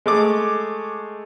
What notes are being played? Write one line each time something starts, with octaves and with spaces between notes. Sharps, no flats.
G#3 A3 D6